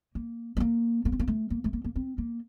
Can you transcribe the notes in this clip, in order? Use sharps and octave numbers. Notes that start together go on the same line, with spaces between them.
A#3
A3
A#3
A#3
C4
A#3
A3
A#3
A3
A#3
A#3
C4
A#3